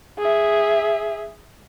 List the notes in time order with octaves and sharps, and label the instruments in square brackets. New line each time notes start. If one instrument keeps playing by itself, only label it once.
[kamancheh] G#4 E5